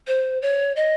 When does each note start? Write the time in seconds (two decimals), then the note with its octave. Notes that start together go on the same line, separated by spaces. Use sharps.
0.07 C5
0.42 C#5
0.76 D#5